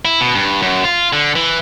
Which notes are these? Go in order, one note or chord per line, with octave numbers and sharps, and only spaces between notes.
E4
B2
G2
F#2
F4
D3
E3